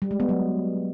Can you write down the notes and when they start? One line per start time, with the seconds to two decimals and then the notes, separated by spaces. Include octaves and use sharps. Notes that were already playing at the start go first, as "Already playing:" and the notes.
0.02 G3
0.11 G#3
0.20 B3
0.29 F#3